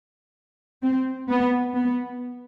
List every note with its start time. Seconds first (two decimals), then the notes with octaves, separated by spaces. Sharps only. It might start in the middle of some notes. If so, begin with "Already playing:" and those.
0.82 C4
1.30 B3
1.75 B3